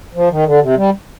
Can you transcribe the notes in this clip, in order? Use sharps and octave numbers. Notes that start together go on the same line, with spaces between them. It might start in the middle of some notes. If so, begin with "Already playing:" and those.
F3
D#3
D3
C3
G3